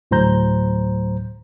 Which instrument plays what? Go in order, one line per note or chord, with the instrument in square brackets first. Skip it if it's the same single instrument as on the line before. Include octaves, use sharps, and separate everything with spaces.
[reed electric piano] D2 A2 F#3 C5 A#5 G6